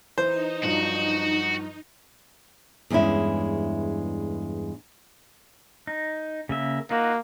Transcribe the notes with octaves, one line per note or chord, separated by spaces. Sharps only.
E3 D#4 C5
G2 F3 F#3 F#4
E2 G2 G#3 C#4 E4
D#4
C#3 A#3 E5
A#3 D#4 F4 F#4